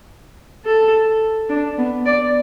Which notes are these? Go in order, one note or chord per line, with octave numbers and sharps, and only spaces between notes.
A4
D4
B3
D5